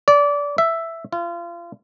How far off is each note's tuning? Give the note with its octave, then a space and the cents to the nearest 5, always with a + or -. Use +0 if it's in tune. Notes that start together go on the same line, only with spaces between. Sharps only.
D5 -25
E5 +5
F4 -30